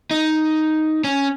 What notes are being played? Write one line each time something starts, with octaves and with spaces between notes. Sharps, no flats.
D#4
C#4